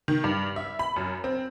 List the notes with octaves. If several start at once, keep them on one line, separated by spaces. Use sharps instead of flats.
D#3
G2
E5
B5
F#2
C4